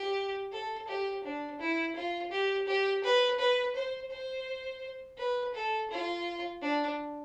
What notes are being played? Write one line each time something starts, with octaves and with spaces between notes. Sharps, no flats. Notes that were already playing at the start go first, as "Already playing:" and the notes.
Already playing: G4
A4
G4
D4
E4
F4
G4
G4
B4
B4
C5
C5
B4
A4
F4
D4